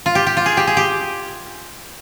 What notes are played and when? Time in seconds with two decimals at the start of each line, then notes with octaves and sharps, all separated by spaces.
0.06 F4
0.15 G4
0.27 G4
0.37 F4
0.46 G#4
0.57 G4
0.67 G#4
0.77 G4